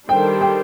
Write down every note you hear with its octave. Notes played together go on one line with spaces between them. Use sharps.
D#3 G3 D4 A4 C5 G5
G5